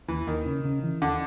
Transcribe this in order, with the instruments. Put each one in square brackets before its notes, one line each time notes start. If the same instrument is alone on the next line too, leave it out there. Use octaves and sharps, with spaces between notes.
[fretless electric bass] D#2 [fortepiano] E3
[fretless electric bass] D#2 [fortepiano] D#3
[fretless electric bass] C#3
C#3
E3
[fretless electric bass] D#2 [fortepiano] D3